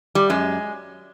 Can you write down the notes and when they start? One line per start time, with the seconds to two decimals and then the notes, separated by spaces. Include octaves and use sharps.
0.15 G3
0.30 F#2 G#3